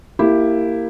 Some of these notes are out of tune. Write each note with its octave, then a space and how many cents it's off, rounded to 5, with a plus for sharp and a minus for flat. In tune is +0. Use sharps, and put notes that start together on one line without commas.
A#3 -15 E4 +0 G4 +0